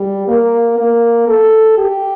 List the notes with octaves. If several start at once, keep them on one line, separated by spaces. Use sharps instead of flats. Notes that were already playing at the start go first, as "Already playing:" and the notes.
Already playing: G3
A#3
A#3
A4
G4